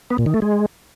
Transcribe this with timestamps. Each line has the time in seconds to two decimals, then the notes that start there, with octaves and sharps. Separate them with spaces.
0.10 B3
0.18 A#2
0.26 D#3
0.34 A3
0.42 G#3